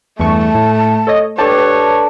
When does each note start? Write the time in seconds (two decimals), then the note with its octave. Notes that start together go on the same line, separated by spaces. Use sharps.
0.19 E2 G2 A3 A5 C#6
0.55 A2
1.07 A4 C#5 D#5
1.38 D4 G4 A4 B4 C#5 D5 A5